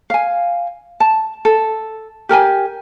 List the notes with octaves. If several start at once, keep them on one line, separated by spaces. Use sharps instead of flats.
F5 G#5
A5
A4
G4 A#4 G5 G#5